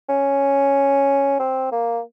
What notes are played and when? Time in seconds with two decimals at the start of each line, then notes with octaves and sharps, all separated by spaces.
0.09 C#4
1.40 C4
1.72 A#3